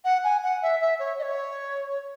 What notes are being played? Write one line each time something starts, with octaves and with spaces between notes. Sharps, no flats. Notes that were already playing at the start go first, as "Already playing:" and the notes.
F#5
G#5
F#5
E5
E5
C#5
D#5
C#5